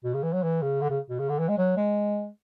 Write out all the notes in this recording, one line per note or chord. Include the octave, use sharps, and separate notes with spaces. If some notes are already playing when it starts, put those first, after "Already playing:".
B2
C#3
E3
F#3
E3
C#3
D3
C#3
B2
C#3
D3
E3
G#3
F#3
G#3